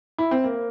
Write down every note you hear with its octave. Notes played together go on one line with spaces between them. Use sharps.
E4
C4
A#3